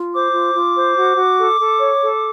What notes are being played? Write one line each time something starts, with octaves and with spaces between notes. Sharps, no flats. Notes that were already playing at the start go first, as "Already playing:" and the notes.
Already playing: F4
C5 D6
F4
F4
C5
F#4
F#4
A4
A4
C#5
A4